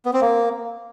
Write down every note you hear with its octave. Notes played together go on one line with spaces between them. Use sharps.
B3
C4
A#3